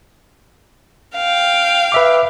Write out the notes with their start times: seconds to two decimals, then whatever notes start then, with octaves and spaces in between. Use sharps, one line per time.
1.15 F5 G5
1.92 B4 E5 D6